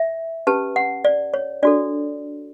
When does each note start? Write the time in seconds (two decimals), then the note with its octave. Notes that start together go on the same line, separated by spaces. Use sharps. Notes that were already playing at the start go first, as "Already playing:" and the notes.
Already playing: E5
0.47 C#4 G4 B4 A5
0.76 F#5
1.05 D5
1.34 C#5
1.63 D4 F#4 A4 D5